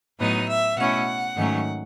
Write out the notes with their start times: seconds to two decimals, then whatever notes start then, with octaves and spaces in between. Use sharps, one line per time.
0.18 A2 F#3 B3 D#4 D#5
0.48 E5
0.77 B2 A3 C#4 E4 F#5
1.36 G#2 D#3 F#3 A3 C#4